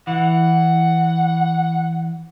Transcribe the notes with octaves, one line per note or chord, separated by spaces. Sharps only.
E3 F#5